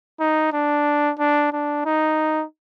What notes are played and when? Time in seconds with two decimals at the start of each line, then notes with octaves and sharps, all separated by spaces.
0.20 D#4
0.53 D4
1.19 D4
1.53 D4
1.86 D#4